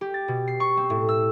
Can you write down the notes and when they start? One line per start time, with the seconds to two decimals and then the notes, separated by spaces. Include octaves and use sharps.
0.01 G4
0.14 A6
0.28 B2
0.48 C7
0.60 C#6
0.77 C4
0.90 A2
1.09 E6